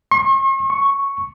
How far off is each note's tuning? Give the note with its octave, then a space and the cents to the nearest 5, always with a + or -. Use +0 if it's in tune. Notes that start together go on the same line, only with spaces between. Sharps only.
C#6 -45
C#6 +0